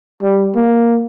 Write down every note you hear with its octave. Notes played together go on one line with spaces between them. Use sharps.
G3
A#3